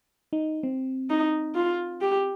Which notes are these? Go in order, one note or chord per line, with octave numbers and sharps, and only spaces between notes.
D#4
C4
D#4
F4
G4